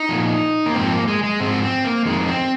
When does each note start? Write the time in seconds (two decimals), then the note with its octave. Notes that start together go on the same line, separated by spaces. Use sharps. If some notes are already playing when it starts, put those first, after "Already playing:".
Already playing: D#4
0.09 A#2 F3
0.66 A#3
0.75 G#2 F3 C4
0.91 A#3
1.08 G#3
1.24 G#3
1.40 G#2 F3 C4
1.62 C4
1.84 A#3
2.06 F2 D#3 G#3
2.28 C4